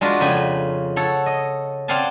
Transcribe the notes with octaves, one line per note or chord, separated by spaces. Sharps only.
G#3 D4 F4 F#4 B4
F2 C#3 B4 G5 G#5
A4 C#5 F#5
D#5
C4 D5 F5 F#5 G#5 A5